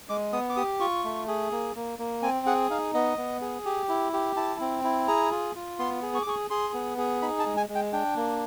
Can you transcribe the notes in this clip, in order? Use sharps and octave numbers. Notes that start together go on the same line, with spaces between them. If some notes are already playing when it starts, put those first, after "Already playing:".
G#3 D6
B3 D#6
D6
G4 D#6
F4 C#6
A3
G#4
A#3
A#3
A#3
C4 G#5
G#4 F#5
D#4 F5
B3 D#5
B3
G#4
G4
E4
G4
E4 A5
C4
E4
G#4 A#5
F4
F4
B3 C6
G#4
C#6
D6
G#4 C#6
G#4 C6
B3
G#4
D#4 B5
A5
G#3
G#5
G#3
G5
D4 G5
A#3